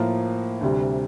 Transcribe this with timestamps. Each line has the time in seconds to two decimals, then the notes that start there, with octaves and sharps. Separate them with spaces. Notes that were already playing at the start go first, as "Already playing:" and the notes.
Already playing: A2 F3 A#3 F4
0.61 D2 C3 G3